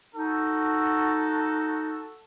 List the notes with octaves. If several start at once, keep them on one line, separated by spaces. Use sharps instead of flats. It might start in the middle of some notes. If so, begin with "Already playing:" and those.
D#4 F#4 A4